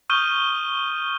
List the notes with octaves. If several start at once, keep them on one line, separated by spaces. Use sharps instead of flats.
C#6 D#6 F6 G6 D#7 G7